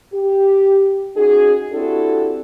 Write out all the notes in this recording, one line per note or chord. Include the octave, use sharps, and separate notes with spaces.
G4
C#4 D#4 F#4 G#4
C4 D4 E4 F#4 G4 A4